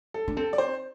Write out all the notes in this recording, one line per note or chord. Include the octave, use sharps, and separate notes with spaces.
A4
D4
C4 A4
D5
C5